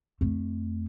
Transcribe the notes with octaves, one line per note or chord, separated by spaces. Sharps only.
F2 A3